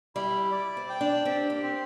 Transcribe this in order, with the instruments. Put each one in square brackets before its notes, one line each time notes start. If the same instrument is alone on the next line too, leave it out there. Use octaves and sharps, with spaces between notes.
[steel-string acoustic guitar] G3 [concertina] E4
[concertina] D5
[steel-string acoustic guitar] C4
[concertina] G5
[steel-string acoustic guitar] D4
[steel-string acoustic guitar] C4 [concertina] G4
[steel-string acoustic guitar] A#3
[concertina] C4